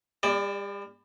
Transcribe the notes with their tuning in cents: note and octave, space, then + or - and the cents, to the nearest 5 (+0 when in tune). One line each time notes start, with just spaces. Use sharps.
G3 +40 D5 +0